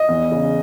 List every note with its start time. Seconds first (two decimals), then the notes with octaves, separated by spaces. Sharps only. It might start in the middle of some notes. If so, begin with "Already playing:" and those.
Already playing: D#5
0.08 E2
0.32 C#3